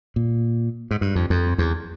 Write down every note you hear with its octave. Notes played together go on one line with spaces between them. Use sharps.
A#2
G#2
G2
F2
F2
E2